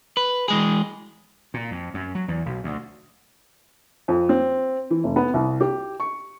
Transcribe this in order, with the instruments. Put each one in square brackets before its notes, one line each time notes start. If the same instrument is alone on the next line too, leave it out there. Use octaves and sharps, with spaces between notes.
[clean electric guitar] B4
E3 G#3 G#4
[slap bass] A#2
F2
F#2
F#3
E2
B1
D2
[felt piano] F2
C4
E3
F1
B3
C2
G4
C#6